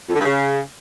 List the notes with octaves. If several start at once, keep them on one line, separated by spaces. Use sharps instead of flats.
F2
D3
G2
C#3